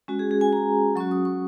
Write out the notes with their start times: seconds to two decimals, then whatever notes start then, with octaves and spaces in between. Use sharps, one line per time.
0.08 G#3 C#4 F#4
0.19 G#4
0.31 G#4
0.41 G#5
0.53 A#5
0.96 F#3 C#4 F#4 C#6
1.11 D#6
1.25 C#6